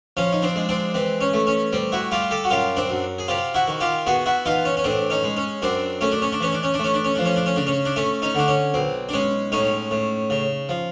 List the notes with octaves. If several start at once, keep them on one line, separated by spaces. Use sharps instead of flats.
F3 C#4
D#4
C4 D4
G#3
C4 D4
E3 C4
C#4
A3
C#4
G3 C4
E4 F#4
G3 F4 G4
G4 A4
F#4
F#2 F4 G4
C4 D4
F#2
G#4
C3 F4 G4
E4 F#4
D#3
F4 G4
B3 F#4 G#4
E4 F#4
E3 D#4 F4
C#4
C#4
A2 C4 D4
C#4 D#4
G#3
C#4
F#2 C4 D4
A3 C#4
D4
C#4
D4
E3 C#4
D4
C#4
D4
A3 C#4
D4
C#4
F3 D4
C#4
D4
C#4
C#3 D4
C#4
D4
A3 C#4
C#4 D#4
D3 D4
C#4
B1 C4
D4
G#3 C#4
A2 C#4 D#4
A2
C#3
F3